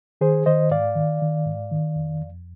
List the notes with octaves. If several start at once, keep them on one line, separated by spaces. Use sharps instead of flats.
D#3 G#4 C5
D#3 C5 D#5
G#2 D5 F5
D#3
D#3
G#2
D#3
F2
F2